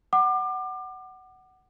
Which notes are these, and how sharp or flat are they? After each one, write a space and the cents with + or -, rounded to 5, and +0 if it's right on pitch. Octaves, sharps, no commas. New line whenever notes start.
F#5 +15 D6 +30